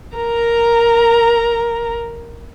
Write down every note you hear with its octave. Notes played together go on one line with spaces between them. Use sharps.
A#4 A#5